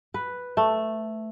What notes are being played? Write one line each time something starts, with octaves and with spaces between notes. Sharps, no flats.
B4
A3